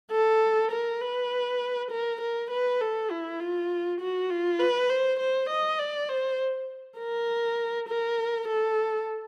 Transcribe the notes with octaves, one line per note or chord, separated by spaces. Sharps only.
A4
A#4
B4
A#4
A#4
B4
A4
E4
F4
F#4
F4
B4
C5
C5
D#5
D5
C5
A#4
A#4
A4